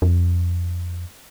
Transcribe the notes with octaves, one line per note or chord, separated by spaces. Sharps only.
F2